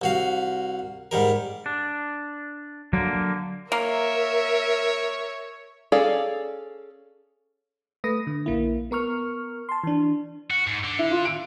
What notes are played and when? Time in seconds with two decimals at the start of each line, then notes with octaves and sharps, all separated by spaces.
0.02 C2 F#4 F5
1.11 G#2 G3 A#4
1.66 D4
2.93 D3 F#3 A#3
3.72 A#3 A#4 C#5 E5
5.92 C#4 G#4 A4 D5 F5
8.04 A3 B4 D#6 A#6
8.27 D3
8.46 A#1 A#3 E4
8.91 B3 A#4 C#6 F6
9.69 A5 C6
9.84 E3 D4
10.50 F#4
10.67 G#2
10.84 D3
10.99 E4
11.11 F4
11.25 D7